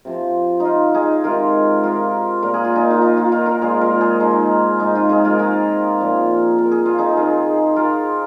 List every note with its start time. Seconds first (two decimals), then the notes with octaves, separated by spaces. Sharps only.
0.05 C3 F3 C4
0.60 D#4 F4
0.94 D#4 G#4
1.24 C3 D#3 G#3 C4 F4 A#4
1.83 F4 A#4
2.42 A#2 A#3 A#4
2.54 G#4
2.64 F4
2.75 D#4 G#4
2.90 F4
3.02 D#4
3.17 F4
3.32 F4 A#4
3.46 F4 A#4
3.61 A#2 G#3 C4 G#4 C5
3.81 F4 A#4
4.01 G#4 C5
4.20 D#4 G#4
4.79 G#2 G#3 C4 D#4
4.95 F4
5.09 D#4 G#4
5.25 F4 A#4
5.39 F4 A#4
5.98 A#2 F3 C4
6.58 A#4
6.71 G#4
6.85 F4
6.98 D#4 G#4
7.08 G#4
7.17 D#3 C4 F4
7.76 F4 A#4